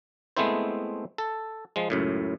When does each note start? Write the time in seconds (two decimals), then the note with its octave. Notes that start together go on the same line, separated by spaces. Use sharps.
0.37 G#3 A3 B3 C4 E4 C5
1.18 A4
1.76 F3 G#3
1.90 C#2 F#2 A2